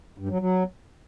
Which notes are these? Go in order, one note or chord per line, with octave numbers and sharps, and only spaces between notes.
G2
F#3
F#3